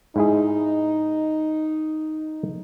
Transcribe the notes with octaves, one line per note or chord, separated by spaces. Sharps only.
G#2 D#4 E4 G#4